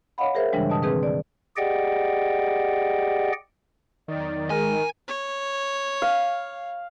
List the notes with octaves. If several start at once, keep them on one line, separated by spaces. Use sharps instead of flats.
C#5 D#5 F5 F#5 B5
G#4 A#4 C5 E5
G2 C#3 E3 G3 G#3 D4
B2 D#5 A5 D#6
D#3 C4 G#4 B4 D#6
D5
G4 G#4 D5 D#5 F#5 G5
E2 D#3 F#3 D5
G#3 A#4 G#5
C#5
F5